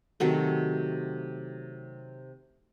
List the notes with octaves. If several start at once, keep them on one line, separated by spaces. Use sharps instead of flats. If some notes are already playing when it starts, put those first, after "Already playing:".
C3 D#3 F#3 A3